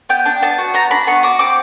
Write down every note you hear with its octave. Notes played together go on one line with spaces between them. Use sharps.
B3 G5
D4
B3 A5
F#4
B3 A#5
D4 B5
B3 C#6
F#4 D6
C4 D6